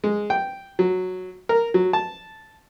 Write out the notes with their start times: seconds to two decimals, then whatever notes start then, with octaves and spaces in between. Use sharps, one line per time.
0.04 G#3
0.30 G5
0.79 F#3
1.49 A#4
1.74 F#3
1.93 A5